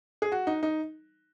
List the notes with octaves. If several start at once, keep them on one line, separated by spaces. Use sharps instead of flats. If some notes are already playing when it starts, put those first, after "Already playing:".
G#4
F#4
D#4
D#4